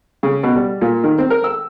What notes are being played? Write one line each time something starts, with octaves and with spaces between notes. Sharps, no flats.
C#3
B2
G3
A#2
D#3
C4
A#4
E6